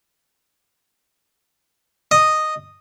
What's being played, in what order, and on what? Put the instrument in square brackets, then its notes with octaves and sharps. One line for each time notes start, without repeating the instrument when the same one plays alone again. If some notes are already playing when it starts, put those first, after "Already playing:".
[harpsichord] D#5